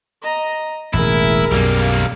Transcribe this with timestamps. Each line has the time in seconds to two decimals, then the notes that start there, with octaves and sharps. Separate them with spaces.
0.22 D#5 A#5
0.94 E1 A1 E4 G#4 A#4
1.51 B1 F#2 G3 A#3